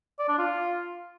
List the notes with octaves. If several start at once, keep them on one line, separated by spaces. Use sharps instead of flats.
D5
D4
F4